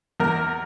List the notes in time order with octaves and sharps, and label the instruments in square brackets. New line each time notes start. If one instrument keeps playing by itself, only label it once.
[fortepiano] E2 A#4